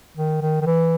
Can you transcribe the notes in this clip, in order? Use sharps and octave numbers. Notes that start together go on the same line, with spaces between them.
D#3
D#3
D#3
E3